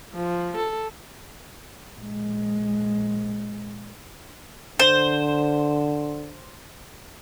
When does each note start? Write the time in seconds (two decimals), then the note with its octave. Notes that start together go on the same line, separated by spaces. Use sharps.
0.14 F3
0.57 A4
1.96 A#1 G#3
4.79 D3 C5